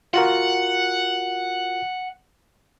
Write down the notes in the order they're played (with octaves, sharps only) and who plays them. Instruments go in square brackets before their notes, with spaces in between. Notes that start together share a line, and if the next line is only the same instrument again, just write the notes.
[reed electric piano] F4 F#4 A#4 [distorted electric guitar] F#5